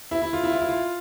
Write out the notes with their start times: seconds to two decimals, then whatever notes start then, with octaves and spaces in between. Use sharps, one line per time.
0.11 E4
0.22 E4
0.33 F4
0.43 E4
0.52 F4
0.60 E4
0.69 F4